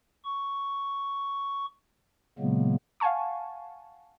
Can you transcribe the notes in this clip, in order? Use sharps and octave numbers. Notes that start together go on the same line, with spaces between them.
C#6
A#2 C#3 F#3 G#3 A#3 B3
F5 F#5 G#5 A5 C#6